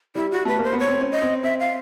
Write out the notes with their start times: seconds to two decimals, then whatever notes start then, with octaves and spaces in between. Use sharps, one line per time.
0.15 G3 E4
0.32 F#4
0.45 A3 B4
0.59 A#3 C5
0.73 B3
0.79 C#5
0.87 C4
1.01 C#4
1.12 D#5
1.22 C4
1.43 C4 E5
1.60 F5